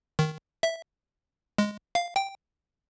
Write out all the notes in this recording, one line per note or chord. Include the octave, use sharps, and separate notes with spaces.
D#3
E5
G#3
F5
G5